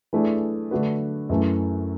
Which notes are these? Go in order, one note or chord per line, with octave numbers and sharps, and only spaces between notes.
E3 A3 D4 G#4
D3 A3 D4 F#4 B4
F#2 E3 A3